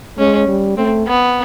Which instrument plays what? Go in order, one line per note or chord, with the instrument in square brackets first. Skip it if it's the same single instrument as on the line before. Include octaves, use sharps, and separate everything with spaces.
[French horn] G#3 [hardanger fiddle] C#4
[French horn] G3
[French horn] A3 [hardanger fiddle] C4
[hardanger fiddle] B3